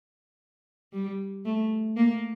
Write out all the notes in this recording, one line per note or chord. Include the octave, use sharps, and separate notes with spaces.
G3
A3
A#3